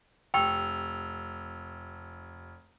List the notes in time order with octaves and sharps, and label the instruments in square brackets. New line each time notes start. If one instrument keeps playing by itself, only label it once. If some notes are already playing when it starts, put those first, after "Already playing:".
[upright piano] F1 [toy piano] G5 C#6 [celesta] E6 F7